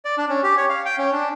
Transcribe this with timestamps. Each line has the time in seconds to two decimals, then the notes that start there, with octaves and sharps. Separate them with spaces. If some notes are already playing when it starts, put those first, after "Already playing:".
0.05 D5
0.18 D4
0.30 C#4
0.43 G4
0.57 C#5
0.69 F5
0.86 G5
0.98 C#4
1.12 D4